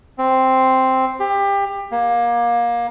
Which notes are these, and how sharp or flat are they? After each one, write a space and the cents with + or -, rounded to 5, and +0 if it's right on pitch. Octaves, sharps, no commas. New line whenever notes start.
C4 +0
G4 +25
A#3 +25